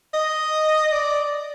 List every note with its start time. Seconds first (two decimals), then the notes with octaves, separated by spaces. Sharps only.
0.14 D#5
0.92 D5